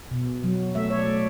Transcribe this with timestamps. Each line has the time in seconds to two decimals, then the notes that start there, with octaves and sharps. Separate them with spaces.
0.11 B2
0.44 F#3
0.75 A3 E5
0.90 C#5
0.99 D5
1.07 A3